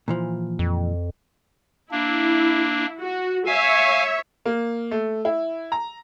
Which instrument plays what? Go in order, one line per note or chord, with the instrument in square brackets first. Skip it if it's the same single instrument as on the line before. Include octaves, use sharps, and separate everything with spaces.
[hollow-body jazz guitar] A#2 E3 F3
[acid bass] F2
[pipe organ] A#3 D4 [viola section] E4
[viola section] F#4
[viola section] C#5 E5 [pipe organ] F5 G#5
[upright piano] A#3
A3
E4
A#5